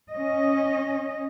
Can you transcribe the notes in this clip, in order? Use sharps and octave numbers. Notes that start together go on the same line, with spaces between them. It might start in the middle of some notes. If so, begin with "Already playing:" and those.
C#4 D#5